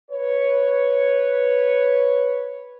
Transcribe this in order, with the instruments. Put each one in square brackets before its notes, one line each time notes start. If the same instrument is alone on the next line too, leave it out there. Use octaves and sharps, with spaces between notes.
[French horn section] B4 C#5